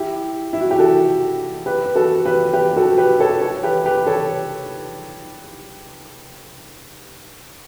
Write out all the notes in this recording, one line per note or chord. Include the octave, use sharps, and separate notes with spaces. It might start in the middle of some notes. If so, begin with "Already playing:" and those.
Already playing: E4 G4
E4
F#4
G4
F#4 A4
G4 B4
B4
F#4 A4
G4 B4
G4 B4
F#4 A4
G4 B4
A4 C#5
A4 C#5
G4 B4
G4 B4
A4 C#5